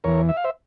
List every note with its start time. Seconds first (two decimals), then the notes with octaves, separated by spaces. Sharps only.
0.04 E2 E3 A#4 C#5
0.29 E5
0.37 F5
0.44 C5 E5